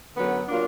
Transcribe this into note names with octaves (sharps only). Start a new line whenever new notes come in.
F#2 D3 F#3 B3
A#2 F#3 A#3 D4 F4